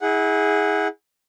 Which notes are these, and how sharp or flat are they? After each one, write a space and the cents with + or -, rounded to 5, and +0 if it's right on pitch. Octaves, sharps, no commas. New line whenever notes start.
E4 -30 G#4 -5 F#5 +0